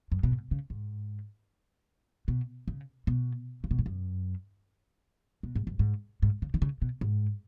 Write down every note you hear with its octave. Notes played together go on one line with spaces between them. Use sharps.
F#2
B2
G#2
C#3
G#2
B2
C#3
B2
C#3
B2
G#2
F#2
B2
G#2
F#2
G#2
G#2
C#3
D#3
C#3
B2
G#2